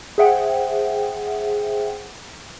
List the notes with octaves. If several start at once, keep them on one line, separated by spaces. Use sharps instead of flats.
G#4 C5 E5 F#5 G5